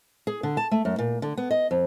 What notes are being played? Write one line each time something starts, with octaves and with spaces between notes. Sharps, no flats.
G#4
D3
A5
A3
F#2
A#2
D3
B3
D#5
F2